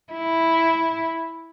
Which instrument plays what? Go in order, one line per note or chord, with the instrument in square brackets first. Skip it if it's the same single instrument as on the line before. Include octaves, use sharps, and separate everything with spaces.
[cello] E4